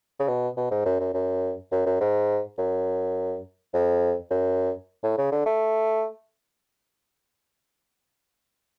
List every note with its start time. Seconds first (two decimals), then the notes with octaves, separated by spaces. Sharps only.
0.19 C#3
0.28 B2
0.57 B2
0.71 G#2
0.86 F#2
1.00 F#2
1.14 F#2
1.72 F#2
1.86 F#2
2.01 G#2
2.58 F#2
3.74 F2
4.31 F#2
5.03 A2
5.18 C#3
5.32 D3
5.46 A3